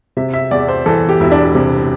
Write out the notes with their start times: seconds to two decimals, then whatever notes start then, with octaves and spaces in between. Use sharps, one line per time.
0.17 C3 E5
0.33 E5
0.51 E2 D5
0.68 C5
0.86 E3 A4
1.09 G4
1.20 E1 E4
1.32 D4
1.55 C3